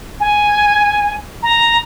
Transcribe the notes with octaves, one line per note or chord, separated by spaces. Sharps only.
G#5
A#5